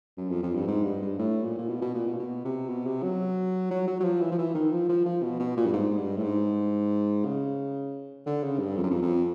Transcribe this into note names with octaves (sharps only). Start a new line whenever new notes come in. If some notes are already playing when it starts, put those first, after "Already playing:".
F#2
F2
F2
G2
G#2
G2
G2
A2
A#2
A#2
B2
B2
A#2
B2
A#2
B2
C3
B2
C3
F#3
F#3
F#3
F#3
F3
E3
F3
E3
D#3
F3
F3
F3
B2
B2
A#2
G2
G#2
G2
A2
G#2
C#3
D3
C#3
G2
F2
F#2
F2
F2